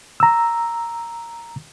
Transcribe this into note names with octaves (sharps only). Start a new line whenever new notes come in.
A#5 E6